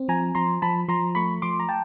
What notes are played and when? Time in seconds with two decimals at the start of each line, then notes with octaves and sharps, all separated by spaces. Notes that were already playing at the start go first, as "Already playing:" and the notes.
Already playing: C4
0.08 F3 G#5 A#5
0.35 F3 A#5 C6
0.62 F3 A5 B5
0.88 F3 A#5 C6
1.15 A3 B5 C#6
1.42 F3 C6 D6
1.60 A#5
1.69 G5 A5